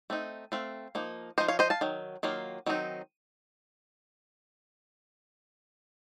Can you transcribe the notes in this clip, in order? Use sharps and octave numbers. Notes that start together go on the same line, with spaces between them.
A3 C4 D#4
A3 C4 F5
F3 A#3 D#4
F3 A#3 D#4 C5 D#5
C#5 F5
C5 D#5
F5 A5
D#3 F#3
D#3 F#3 A#3 F4
D#3 F#3 C4 D#4